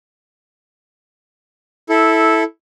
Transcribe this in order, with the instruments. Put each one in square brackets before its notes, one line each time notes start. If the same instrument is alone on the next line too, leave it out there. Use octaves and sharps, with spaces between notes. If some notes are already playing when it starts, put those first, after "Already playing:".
[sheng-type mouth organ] E4 A4